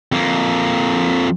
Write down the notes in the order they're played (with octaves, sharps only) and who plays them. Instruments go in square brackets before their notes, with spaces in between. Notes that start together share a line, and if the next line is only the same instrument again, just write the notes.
[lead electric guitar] F2 A#3